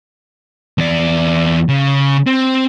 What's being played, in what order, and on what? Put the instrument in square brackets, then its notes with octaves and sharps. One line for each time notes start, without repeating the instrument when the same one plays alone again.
[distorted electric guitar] E2 D5
C#3
C4